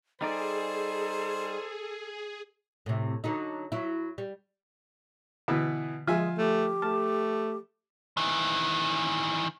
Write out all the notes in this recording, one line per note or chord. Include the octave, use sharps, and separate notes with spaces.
G3 D#4 G#4 A4 C5 D5
A2 C3
D3 F#3 D#4
F#3 E4
G3
B2 D3 E3 B3
F3 G#3 F4 E5 G#5
A3 G4
A3 A5 F6
D#3 E3